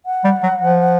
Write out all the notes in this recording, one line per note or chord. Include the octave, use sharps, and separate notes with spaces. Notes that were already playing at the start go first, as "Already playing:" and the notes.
F#5
G3
F#3
F3